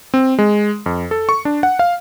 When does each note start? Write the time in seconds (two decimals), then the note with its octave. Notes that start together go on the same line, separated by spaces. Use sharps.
0.14 C4
0.39 G#3
0.86 F2
1.11 A4
1.29 C#6
1.45 D4
1.63 F#5
1.79 F5